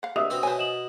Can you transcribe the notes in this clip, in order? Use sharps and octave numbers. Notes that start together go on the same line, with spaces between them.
F5 F#5
D4 G4 D#5 E5 D#6 E6 F7
B2 C4 B5 E6
B2 B3 C5 C#5 G#5
D#5 E7 F#7